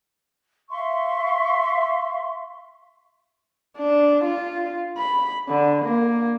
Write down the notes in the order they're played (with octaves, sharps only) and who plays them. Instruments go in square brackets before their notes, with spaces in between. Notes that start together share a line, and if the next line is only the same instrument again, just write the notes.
[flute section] E5 F5 C6 C#6
[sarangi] D4
F4
B5
D3
A#3